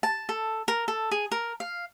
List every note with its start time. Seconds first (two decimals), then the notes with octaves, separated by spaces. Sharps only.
0.03 A5
0.29 A4
0.68 A#4
0.88 A4
1.11 G#4
1.32 A#4
1.60 F5